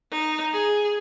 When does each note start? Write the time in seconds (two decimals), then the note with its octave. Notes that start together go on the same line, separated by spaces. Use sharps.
0.11 D#4
0.53 G#4